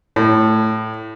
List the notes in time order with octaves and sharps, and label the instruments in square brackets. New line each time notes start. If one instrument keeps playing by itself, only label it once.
[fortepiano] A2